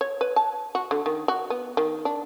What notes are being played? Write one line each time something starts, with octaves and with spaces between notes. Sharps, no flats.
C#5
B4
A5
F#4
D3
D#3
F#4
B3
D#3
D4